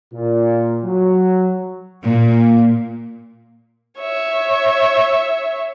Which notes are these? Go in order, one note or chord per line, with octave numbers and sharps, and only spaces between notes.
A#2
F#3
A#2
C#5 E5